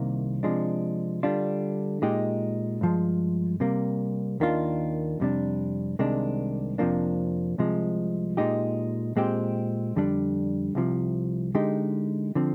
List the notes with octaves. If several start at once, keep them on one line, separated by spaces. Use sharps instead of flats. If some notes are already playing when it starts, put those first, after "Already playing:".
Already playing: C2 C3 D#3 A#3
C3 F3 G#3 D4
D3 G3 D4 F4
A#2 G#3 D#4 G4
G2 F3 G#3
C3 G3 A#3
D#2 D#3 A#3 D4 F4
F2 C3 G3 D4
C2 C3 D#3 G#3 D4
F2 C3 F3 A#3 D4
C2 C3 F3 G#3
A#2 G#3 D#4 G4
A#2 G#3 C4 G4
F2 D3 G3 D4
C2 C3 F3
D3 G#3 D#4 G4
D3 F3 C4